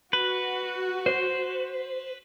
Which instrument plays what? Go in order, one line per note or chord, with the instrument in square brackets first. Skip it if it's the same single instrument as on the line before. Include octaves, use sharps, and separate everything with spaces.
[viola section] F#4 [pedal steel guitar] B4
[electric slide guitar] C5